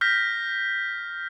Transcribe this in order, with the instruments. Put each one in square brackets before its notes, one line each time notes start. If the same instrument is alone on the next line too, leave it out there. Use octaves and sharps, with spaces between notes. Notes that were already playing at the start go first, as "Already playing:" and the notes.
[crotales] F6 G6 A#6 B6